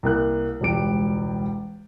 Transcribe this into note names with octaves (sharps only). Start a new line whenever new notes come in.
C2 A#3 F#6
E1 C#2 G3 D7